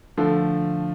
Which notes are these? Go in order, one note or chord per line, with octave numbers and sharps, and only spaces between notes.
D3 F3 A3